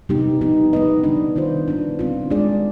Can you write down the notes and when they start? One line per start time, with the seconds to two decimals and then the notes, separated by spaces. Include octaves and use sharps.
0.09 C3 G3 B3 D#4 G4
0.41 F3 B3 D#4 G4
0.73 B3 D#4 B4 D#5
1.04 D3 G3 D4
1.36 D#3 B3 F4 C5
1.68 G3 B3 D4
1.99 D3 G3 C4 F4
2.30 G#3 D4 G#4 D5